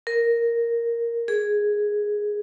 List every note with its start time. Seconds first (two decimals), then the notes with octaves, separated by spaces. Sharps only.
0.07 A#4
1.28 G#4